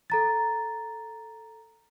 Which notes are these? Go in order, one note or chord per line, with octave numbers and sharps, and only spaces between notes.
A4 A#5 A6